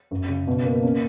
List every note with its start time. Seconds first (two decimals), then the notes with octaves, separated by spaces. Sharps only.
0.11 F#2
0.29 C#3
0.47 B2
0.65 A#3
0.83 C#4